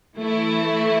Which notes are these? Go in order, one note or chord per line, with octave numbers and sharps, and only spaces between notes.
E3 A3 E4